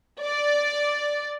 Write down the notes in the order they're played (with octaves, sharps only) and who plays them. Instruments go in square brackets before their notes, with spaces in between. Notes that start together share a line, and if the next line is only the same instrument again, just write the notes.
[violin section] D5